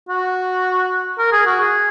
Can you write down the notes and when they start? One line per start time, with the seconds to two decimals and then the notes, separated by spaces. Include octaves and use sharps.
0.09 F#4
1.19 A#4
1.32 G#4
1.46 F#4
1.60 G#4